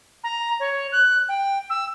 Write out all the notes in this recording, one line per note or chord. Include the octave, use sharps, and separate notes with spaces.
A#5
C#5
F#6
G5
E6